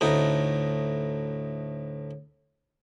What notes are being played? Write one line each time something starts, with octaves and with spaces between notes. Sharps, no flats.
D2 A2 D#4